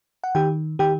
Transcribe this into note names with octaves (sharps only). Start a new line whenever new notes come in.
F#5
D#3 G4 G5
D#3 G4 G5